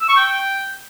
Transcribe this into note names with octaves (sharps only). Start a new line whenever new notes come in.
E6
C#6
G5